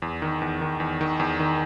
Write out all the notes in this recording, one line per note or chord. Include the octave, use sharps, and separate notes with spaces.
E2
D#3
E2
D#3
E2
D#3
E2
D#3